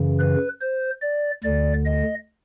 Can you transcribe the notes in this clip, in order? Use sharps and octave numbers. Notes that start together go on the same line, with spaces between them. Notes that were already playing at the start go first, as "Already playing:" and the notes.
Already playing: F#2 C#3 E3
B4
C5
D5
D2 D3 D5
D#5